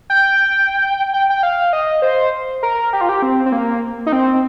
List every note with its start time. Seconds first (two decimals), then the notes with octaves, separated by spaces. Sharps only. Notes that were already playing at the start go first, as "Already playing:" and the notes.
0.10 G5
1.13 G5
1.30 G5
1.43 F5
1.73 D#5
2.02 C5
2.63 A#4
2.93 G4
3.01 F4
3.09 G4
3.22 C4
3.46 C4
3.52 A#3
4.06 D#4
4.12 C4